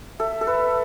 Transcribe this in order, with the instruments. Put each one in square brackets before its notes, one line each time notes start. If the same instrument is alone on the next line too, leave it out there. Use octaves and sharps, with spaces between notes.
[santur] A4 [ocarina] E5
[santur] A4
B4